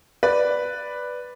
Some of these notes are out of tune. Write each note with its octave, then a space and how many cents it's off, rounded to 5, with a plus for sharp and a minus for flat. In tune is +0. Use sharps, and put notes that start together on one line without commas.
B4 +0 D5 +0